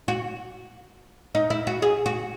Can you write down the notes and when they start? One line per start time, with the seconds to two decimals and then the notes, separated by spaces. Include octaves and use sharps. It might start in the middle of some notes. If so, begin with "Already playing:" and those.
0.08 F#4
1.35 D#4
1.50 E4
1.67 F#4
1.82 G#4
2.06 F#4